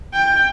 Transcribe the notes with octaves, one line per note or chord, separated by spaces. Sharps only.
G5